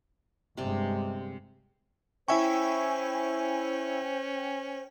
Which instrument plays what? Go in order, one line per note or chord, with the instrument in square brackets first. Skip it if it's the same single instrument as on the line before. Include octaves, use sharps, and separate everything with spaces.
[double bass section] G1 G2 G#3 [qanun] C3 D5
[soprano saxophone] C#4 [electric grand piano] E4 E5 C#6 [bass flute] C5 [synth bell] G5 G#5